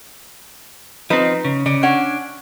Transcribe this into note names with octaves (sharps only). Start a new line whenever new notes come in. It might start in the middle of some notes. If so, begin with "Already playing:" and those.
F3 C4 D#4 B4
C#3
C#3 D5
C#4 D4 F#5